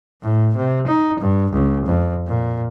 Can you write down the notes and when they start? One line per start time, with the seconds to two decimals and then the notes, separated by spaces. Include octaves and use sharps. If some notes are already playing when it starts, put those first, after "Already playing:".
0.22 A2
0.57 C3
0.87 D#4
1.20 G2
1.53 C#2
1.86 F2
2.27 A#2